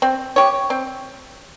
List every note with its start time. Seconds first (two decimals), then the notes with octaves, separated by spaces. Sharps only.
0.02 C4
0.36 G4 C#5
0.70 C4